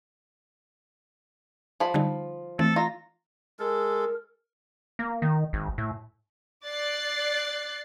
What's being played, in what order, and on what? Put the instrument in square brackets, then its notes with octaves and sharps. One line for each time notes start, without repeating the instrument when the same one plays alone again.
[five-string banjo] F3 B5
[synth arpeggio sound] D3 G3 D#4
[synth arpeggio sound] E3 A3 C4 [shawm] A4
[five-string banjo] F4 [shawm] A#5
[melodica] G#3 A4 [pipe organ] A#4
[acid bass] A#3
D#3
G#1
A2
[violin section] D5 F#6 A6 C7